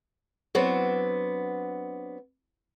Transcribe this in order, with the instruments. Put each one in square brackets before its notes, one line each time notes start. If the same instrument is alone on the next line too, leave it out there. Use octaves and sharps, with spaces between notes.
[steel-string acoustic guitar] F#3 B3 C4 D4